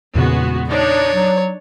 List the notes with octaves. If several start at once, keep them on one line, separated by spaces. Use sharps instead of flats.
E2 A#2 C#3 G#3 B3 F#4
D4 D#4 C#5 D5
F#3